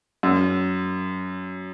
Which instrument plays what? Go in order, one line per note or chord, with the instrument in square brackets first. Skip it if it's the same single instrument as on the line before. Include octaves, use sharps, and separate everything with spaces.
[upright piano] F#2